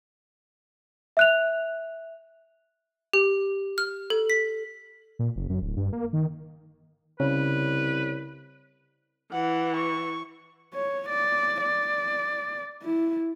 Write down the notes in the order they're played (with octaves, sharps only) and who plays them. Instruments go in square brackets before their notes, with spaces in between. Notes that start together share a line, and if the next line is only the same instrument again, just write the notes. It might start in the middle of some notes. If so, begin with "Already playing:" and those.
[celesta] E5 F#6 F7
[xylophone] G4
F6
A4
B6
[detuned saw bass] A#2
F#1
F#2
D1
G2
A#3
D#3
[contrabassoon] C2 [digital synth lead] C#3 [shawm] B4
[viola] E3 [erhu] F#5
[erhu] C#6
[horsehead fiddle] C#5
D5
D5
E4